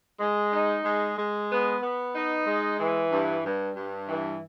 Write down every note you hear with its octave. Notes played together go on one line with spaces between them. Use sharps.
G#3
D#4
G#3
G#3
B3
B3
D#4
G#3
E3
G2
G2
G2
E3